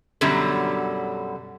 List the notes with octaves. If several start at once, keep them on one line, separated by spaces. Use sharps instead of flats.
F#2 B2 D3 F#3 G3